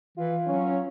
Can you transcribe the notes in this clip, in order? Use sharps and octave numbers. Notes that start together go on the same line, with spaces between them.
E3 F4
F#3 C#4